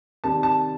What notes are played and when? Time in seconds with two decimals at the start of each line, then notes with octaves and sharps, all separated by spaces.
0.24 C3 D#3 G3 A5
0.43 A5